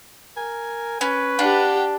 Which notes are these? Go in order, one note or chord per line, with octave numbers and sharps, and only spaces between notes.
A#4 G#5
C#4 B4
D4 G4 F#5 G5